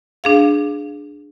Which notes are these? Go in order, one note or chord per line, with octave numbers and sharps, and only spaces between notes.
D4 G#4 F5